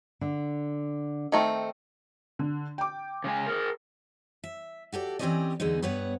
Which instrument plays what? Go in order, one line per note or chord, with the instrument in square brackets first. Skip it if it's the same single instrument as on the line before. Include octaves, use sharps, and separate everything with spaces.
[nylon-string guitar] D3
[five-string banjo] D#3 A3 C4
[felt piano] D3
G5 D6
[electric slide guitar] C#3 G#3 G#5
G#4 A#4
[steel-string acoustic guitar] E5
F#4 G4 A4 D5
E3 C4 C#4 G4 D5 D#5
E2 D3 G#3 B3 D#4
G2 B3 B4 C#5 F#5